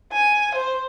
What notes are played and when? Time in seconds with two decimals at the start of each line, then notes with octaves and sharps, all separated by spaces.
0.12 G#5
0.55 C5